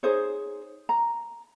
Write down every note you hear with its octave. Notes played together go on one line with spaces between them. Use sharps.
D#4 G#4 C5 C#5
A#5